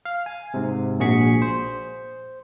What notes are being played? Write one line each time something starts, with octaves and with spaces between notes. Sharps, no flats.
F5
G#5
G#2 C3
A#1 A#2 F#4 G#4 C#6 B6
C5